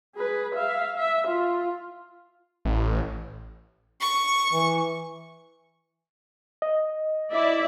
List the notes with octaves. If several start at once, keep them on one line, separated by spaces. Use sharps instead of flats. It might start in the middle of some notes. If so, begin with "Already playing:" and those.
G#4 B4
E5 F5
E5
F4
A1
C#6
E3
D#5
E4 D5 E5